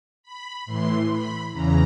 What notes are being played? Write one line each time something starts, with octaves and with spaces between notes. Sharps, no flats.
B5
A2 E3 C6
B5
E2 C#3 E3 A#5